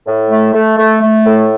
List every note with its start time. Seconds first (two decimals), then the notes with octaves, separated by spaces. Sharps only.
0.06 A2
0.30 A3
0.53 A3
0.77 A3
1.01 A3
1.25 A2